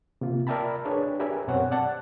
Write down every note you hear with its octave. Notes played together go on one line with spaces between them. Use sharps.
C3 A#3 F4
A#4 D5 E5 G5 A5 B5
D4 G#4 B4 C#5
G4 A#4 B4 E5 G#5
F#2 B2 C4 C5 C#5 F#5
D5 F#5 A5